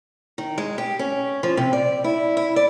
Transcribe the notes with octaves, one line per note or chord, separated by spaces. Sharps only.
D#3
G#3
G4
C#4
F3
C3
D5
E4
E4
D5